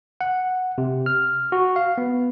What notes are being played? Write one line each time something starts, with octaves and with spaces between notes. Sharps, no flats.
F#5
C3
F6
F#4
F5
B3